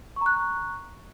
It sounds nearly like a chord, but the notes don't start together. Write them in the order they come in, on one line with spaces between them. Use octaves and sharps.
C#6 A#5 F#6